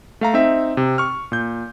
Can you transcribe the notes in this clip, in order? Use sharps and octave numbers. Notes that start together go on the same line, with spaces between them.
A3 F5 A#5
C4 D#4 E5
C3
C#6 F6
A#2 G6